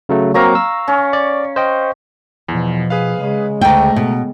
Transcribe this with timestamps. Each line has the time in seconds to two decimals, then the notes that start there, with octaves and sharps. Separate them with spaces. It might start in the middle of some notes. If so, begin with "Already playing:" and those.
0.09 C#3 F#3 A3
0.34 F#3 A#3 C4 F5 A#5 C#6
0.55 E6
0.88 C#4
1.13 D5
1.56 C5 D#5 G5
2.49 E2 B2 F3
2.90 G#4 B4 F5
3.20 C#3 G#3
3.61 D2 A3 G5 A#5
3.96 B2